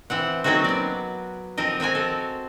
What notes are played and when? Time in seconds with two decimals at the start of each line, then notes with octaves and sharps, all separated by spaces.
0.10 E3 C4 F#5
0.44 F#3 A#3 C4 C#4 D#4 F#4
0.64 B3 D5
1.57 F3 C4 A#4 D#5
1.80 C4 F#4 A#4 G#5
1.95 A4